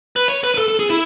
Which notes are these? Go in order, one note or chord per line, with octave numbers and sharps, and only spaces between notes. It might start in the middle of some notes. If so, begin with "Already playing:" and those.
B4
C#5
B4
B4
A4
A4
G#4
E4